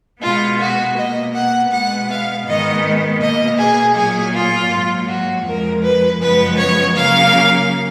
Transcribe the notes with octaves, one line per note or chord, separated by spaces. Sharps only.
B2 G#3 B3 F4
F#4
B2 A#3 D#5
F#5
B2 G#3 B3 F#5
F5
G#2 D#3 G#3 B3 D#5
B2 A#3 D#5
G#4
A#2 F#3 A#3 G#4
F4
G#2 F#3 A#3
F#4
F2 F3 G#3 A#4
B4
F#2 C#3 F3 G#3 B3 B4
C#5
C#3 F#3 A#3 F5